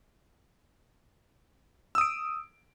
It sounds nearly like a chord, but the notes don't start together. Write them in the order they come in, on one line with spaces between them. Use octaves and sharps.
E6 D#6 D7